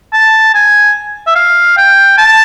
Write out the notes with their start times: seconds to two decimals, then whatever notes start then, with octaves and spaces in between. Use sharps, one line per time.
0.13 A5
0.55 G#5
1.27 E5
1.35 F5
1.77 G5
2.18 A5